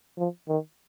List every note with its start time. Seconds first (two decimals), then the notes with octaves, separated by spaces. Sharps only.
0.18 F3
0.48 D#3